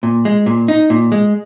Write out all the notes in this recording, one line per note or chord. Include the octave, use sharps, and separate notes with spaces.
A#2
G#3
A#2
D#4
A#2
G#3